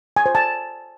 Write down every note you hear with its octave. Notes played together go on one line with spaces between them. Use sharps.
G#5
C5
A5